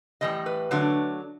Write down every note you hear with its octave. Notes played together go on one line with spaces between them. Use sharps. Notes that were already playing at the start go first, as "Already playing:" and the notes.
A2 E3 G3 D#5
B4
D3 F#3 A3 D4